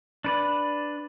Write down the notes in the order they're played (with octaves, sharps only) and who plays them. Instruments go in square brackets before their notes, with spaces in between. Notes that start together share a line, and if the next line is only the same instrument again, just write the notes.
[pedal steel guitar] D4 B4 D5